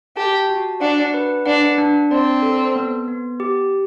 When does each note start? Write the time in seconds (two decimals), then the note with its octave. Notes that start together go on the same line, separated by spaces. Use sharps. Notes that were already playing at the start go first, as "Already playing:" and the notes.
0.17 G4 A5
0.50 F#4
0.81 D4 F#5
1.14 B4
1.46 D4 F#5
1.78 D4
2.11 C4 D5
2.42 A4
2.76 B3
3.08 B3
3.40 G4